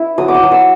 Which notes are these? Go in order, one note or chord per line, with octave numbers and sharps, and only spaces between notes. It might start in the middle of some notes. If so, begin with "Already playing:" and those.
Already playing: E4
F#3 D#6
D6
D#6
F#3
E6